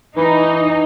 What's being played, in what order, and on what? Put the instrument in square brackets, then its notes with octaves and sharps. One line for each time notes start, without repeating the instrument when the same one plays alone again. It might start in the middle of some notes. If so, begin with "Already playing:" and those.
[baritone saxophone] E3 [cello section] D#4 D#5